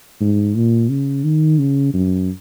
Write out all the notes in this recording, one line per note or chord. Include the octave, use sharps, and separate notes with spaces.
G#2
A#2
C#3
D#3
C#3
F#2